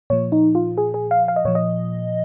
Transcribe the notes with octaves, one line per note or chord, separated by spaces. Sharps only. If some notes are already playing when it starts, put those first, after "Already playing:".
A#2 F3 C#5
D#4
F4
G#4
G#4
F5
F5
D#5
A#2 F3 C#5
D#5